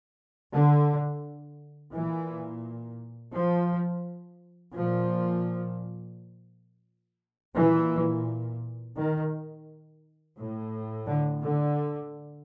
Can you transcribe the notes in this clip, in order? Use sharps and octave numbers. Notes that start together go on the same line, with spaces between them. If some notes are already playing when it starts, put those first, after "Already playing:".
D3
A#2 E3
F3
A#2 F3
A#2 E3
D#3
A2
D3
D3